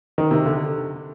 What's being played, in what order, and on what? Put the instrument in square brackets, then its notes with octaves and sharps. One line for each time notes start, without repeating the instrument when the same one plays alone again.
[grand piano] D#3
C3
D3